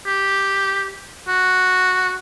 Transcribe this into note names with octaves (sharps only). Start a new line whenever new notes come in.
G4
F#4